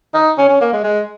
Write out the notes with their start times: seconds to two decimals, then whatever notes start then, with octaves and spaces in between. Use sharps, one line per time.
0.14 D#4
0.38 C#4
0.49 C#4
0.61 A#3
0.73 G#3
0.84 G#3